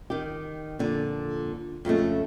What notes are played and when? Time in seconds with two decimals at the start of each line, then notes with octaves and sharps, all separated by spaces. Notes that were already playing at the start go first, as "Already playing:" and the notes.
0.10 D#3 G4
0.79 F2 A#2 D3
1.85 F2 C#3 G#3 A3